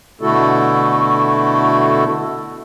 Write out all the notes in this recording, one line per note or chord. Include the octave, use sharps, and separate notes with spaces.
B2 D3 A3 E4 F#4 A4